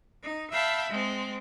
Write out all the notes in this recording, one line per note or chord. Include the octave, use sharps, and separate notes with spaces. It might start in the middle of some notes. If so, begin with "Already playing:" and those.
D#4
E5 F5 G5 A5 B5
G#3 C4